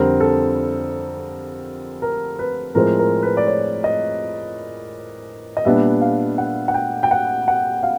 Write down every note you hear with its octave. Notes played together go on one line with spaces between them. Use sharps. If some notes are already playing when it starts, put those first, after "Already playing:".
Already playing: F2 D3 G3 C4 A#4
A4
A#4
B4
A2 F3 G#3 C4 A#4
A#4
B4
D5
C#5
D#5
D#5
A#2 G3 B3 D4 E5
F5
F#5
F#5
G5
G5
F#5
F#5
F5